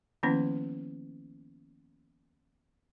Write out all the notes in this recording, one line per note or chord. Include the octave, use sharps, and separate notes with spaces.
D#3 F3 A#3 B3 C#4 E4